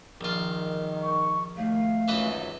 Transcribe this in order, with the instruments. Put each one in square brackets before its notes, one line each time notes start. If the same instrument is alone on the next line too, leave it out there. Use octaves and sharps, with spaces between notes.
[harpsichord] A#1 F4 [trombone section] D#3
[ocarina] C#6
[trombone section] D#2 [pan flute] A3 [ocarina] F5
[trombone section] G#1 C#2 F#2 [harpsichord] E3 B4 D#5